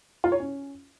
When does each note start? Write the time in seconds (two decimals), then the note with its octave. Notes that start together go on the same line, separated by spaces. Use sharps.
0.24 F4
0.32 C#5
0.40 C#4